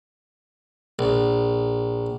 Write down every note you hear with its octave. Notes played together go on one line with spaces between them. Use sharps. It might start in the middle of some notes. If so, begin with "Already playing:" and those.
A#1